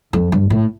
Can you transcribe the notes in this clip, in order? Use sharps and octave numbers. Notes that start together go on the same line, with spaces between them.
F2
G2
A2